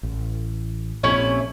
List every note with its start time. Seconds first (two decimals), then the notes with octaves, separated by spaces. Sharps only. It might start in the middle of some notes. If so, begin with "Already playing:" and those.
0.03 A1
1.03 A#1 C3 A3 C#4 E4